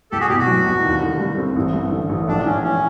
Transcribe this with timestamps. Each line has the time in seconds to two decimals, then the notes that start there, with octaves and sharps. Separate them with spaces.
0.11 C2 G4 A4
0.20 F#4 G#4
0.30 B2 G4
0.39 F#4
0.47 F#3
0.66 C2
0.84 D#2
1.02 D3
1.19 G3
1.38 C4
1.56 A1
1.74 G2
1.92 D3
2.09 A1
2.28 A#1 D4
2.46 G#2 C#4
2.63 E3 C#4